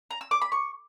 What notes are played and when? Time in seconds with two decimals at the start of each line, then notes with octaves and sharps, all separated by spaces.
0.11 A#5
0.21 E6
0.31 D6
0.41 B5
0.52 C#6